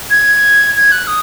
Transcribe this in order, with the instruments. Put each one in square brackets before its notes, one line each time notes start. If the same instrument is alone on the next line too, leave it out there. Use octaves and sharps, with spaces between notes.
[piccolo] G#6
G#6
F#6
D#6